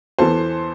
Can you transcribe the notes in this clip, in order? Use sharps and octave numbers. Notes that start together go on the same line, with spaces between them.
E2 E3 A4 C5